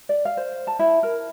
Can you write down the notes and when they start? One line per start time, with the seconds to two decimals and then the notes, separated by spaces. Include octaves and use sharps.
0.09 D5
0.25 F5
0.37 C5
0.67 A5
0.79 E4
1.03 A#4